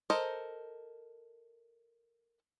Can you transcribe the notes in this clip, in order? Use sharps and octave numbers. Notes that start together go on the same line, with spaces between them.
A4 A#4 C5 D#5